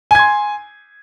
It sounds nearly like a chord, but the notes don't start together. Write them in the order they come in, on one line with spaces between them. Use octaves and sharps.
G#5 G#6 C6